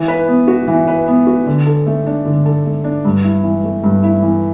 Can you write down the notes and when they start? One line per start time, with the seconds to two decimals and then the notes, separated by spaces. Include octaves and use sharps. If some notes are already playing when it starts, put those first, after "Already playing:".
Already playing: E3
0.08 B4
0.28 B3
0.48 F#4
0.68 E3
0.88 B4
1.08 B3
1.27 F#4
1.46 D3
1.66 A4
1.87 A3
2.07 D4
2.25 D3
2.46 A4
2.66 A3
2.84 D4
3.05 G2
3.24 E4
3.43 E3
3.64 A3
3.84 G2
4.04 E4
4.22 E3